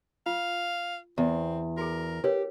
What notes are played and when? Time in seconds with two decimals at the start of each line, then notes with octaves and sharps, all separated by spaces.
0.26 F4 F5
1.18 E2 C4
1.77 F#4 G#4 A#4
2.24 G4 A#4 B4 C#5